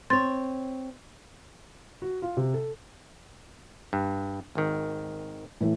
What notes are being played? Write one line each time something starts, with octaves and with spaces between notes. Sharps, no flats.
C4 C#5 C6 A6
F#4
F4
C3
A4
G2
G#1 D#3
A2 E3 A3